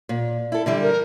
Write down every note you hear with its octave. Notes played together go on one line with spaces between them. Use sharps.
A#2
E4 A4
D3 E3 G3 E5
A#4